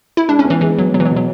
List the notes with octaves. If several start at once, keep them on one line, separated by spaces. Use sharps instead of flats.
E4
G#3 D4
C#4
B3
E3
E3 G#3
F#3 B3
B2 F#3
E3
F#3
B2
F#3